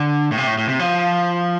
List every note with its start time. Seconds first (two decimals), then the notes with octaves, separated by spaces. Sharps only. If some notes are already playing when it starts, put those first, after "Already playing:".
Already playing: D3
0.32 A2
0.38 C3
0.47 A2
0.58 A2
0.68 C3
0.79 F3